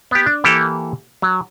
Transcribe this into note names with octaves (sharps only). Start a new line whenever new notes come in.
B3 G4
D4
E3 A#3 G4 A4
F#3